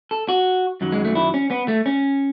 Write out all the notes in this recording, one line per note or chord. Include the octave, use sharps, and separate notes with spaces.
A4
F#4
F#2 D#3 F#3
G#3
A3
E4
C#4
B3
A3
C#4